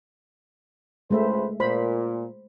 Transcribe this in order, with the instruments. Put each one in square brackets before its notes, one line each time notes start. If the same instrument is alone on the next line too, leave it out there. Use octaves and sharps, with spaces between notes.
[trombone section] C#2 B4 C5 [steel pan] G#3 A3 E5
[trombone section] A#2 [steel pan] C5 B5